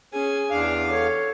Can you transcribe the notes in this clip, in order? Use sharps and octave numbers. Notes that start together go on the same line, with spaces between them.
C#4 G#4 G#5
E2 D4 F5
A4 C#5